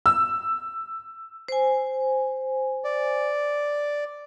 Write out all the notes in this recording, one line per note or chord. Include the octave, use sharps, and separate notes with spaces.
E6
C5 G#5
D5